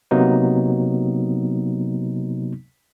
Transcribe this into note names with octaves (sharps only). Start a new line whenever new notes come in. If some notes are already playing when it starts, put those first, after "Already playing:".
C3 F#3 A#3 B3 D#4